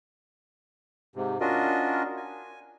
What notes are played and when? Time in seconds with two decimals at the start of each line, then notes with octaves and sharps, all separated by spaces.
1.16 G#2 C3
1.41 C#4 D4 F4 F#4 A#4 D#5
2.17 G#5